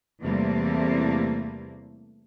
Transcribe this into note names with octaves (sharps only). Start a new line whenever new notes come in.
E2 C3 E3 G3 A3 A#3